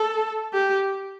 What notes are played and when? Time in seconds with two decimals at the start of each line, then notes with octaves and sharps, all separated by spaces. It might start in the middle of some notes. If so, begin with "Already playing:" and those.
Already playing: A4
0.53 G4